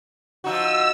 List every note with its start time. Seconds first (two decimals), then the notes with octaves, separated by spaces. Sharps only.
0.44 F3 D#4 F#4 E6